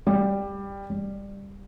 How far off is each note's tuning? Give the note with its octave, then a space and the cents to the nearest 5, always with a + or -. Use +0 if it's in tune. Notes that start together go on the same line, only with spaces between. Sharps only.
G3 +10
G3 +15